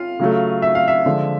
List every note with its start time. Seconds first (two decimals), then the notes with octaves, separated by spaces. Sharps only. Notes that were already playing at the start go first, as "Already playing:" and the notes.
Already playing: F4 F5
0.20 C#3 F#3 A3
0.62 E5
0.75 F5
0.88 E5
1.06 D3 F3 G#3